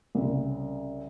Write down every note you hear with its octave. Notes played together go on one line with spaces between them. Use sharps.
C2 C#3